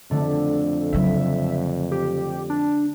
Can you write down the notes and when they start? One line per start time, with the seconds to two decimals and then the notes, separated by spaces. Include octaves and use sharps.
0.11 F2 D3 A3
0.93 C#3 F#3 E5
1.92 G4
2.50 D4